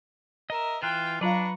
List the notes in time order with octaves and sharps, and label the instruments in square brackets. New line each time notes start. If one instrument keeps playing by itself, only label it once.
[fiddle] A#4 [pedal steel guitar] D#5 E5
[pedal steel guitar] E3 F#6 [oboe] F4 [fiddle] G5
[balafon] F#3 F4 F5 [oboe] D4 [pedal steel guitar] B4 B5 [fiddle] A#5 C#6